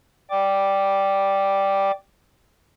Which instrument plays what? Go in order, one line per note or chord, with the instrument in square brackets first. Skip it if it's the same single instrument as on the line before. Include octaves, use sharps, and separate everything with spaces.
[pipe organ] D5 G5 D6